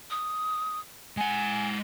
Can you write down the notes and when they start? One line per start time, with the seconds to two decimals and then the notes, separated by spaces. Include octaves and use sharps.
0.10 D#6
1.17 G#3 F#5 G#5